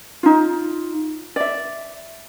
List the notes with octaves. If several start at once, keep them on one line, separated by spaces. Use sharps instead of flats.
D#4 F4
D5 E5